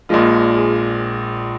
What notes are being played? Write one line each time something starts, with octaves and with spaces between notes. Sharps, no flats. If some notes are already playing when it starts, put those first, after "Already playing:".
A#1 A#2 F3 G#3 F4
G#4